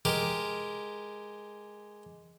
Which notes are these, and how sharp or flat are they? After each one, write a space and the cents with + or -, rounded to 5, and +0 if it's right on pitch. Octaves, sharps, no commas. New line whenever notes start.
G#3 +0 G4 +0 A#4 +0